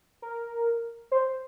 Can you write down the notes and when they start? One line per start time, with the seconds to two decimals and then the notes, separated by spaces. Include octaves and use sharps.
0.22 A#4
1.12 C5